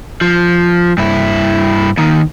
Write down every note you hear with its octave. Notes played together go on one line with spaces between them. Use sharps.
F3
G2 E4
D#2 D#3